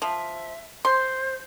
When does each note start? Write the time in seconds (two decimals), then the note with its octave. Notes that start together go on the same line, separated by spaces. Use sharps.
0.02 F3 E5
0.85 C5 C6